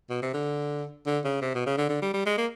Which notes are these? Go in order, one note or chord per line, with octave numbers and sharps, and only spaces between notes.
B2
C3
D3
D3
C#3
C3
B2
C#3
D3
D3
G3
G3
G#3
A#3